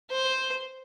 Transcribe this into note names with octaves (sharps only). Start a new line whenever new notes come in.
C5